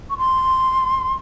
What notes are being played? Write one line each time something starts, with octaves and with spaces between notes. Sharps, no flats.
C#6
C6